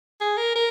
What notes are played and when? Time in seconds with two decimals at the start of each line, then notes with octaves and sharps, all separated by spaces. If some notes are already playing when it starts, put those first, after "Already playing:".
0.21 G#4
0.37 A#4
0.55 A#4